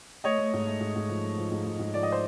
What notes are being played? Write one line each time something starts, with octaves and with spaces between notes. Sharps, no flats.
A3 C#5 D#5
A3
G#2
A3
G#2
G#2
F3
A3
F3
G#2
G#2
G#2
F3 D5
D#5
C5